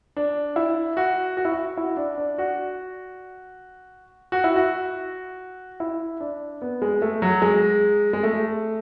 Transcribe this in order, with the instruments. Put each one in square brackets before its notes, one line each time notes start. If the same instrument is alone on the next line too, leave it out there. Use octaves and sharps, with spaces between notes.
[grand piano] D4
E4
F#4
F#4
E4
F#4
E4
D4
D4
F#4
F#4
E4
F#4
E4
D4
B3
G#3
A3
F#3
G#3
G#3
A3